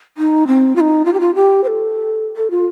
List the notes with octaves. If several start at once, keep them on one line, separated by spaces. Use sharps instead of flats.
D#4
C4
F4
D#4
F4
G4
F4
G4
C5
A4
A4
F4